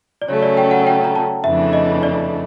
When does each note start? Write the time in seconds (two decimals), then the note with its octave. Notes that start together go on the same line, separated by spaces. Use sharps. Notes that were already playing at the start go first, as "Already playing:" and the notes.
0.22 D5
0.28 C#3 F#3 A3 C#4 C#5
0.43 D5
0.57 G5
0.71 F#5
0.87 G5
1.04 A#5
1.16 A5
1.44 F2 C#3 E3 A3 D4 E5
1.73 D#5
2.03 D5